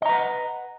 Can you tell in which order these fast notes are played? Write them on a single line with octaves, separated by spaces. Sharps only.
D#5 A#5 B4 F#5